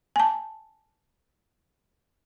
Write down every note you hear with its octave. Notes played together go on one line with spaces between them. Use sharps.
G#5 A5